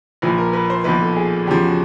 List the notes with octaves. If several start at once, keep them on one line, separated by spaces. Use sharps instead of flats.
A#1 A#2 F3 B4
A#4
B4
C5
B1 A#2 F3 B4
A4
G#4
E2 C#3 F3 G4
F#4